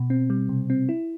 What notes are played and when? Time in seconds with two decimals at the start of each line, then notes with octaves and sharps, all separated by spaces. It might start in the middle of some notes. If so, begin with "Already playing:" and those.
Already playing: B2
0.10 C4
0.30 G3
0.49 C3
0.70 C4
0.89 E4